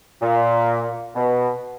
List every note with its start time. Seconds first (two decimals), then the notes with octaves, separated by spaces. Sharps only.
0.22 A#2
1.15 B2